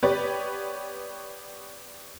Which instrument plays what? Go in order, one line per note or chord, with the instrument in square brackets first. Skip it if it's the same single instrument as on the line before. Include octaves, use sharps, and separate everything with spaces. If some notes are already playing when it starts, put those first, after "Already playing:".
[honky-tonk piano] B3 G4 B4 C#5 D5